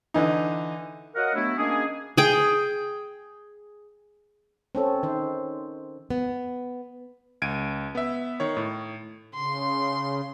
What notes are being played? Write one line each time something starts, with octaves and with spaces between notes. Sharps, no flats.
D3 E3 D#4
F#4 A#4 C#5 D#5 F5 F#5
F#3 A3 B3 D4 E4
D#3 A#3 C#4 D4 G#4
G#4 G5
C4 C#4 A4
D#3 C5
B3
C#2 G#6 D7 D#7
B3 E5
D#3 C#5
A2
C#3 C6